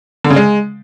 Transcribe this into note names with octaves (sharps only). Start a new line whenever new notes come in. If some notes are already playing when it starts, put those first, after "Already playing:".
D3
C#3
G#3